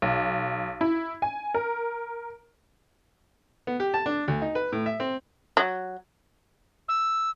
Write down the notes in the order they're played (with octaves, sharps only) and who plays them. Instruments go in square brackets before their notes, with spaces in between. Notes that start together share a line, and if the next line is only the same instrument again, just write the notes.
[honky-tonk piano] B1
E4
G#5
A#4
[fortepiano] B3
G4
A5
D4
D2
D#4
B4
A2
E5
C4
[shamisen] F#3
[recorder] E6